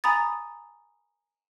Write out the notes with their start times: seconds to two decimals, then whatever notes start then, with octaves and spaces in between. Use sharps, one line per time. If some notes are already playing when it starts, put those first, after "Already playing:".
0.04 G#5 A#5 B5 D#6 A6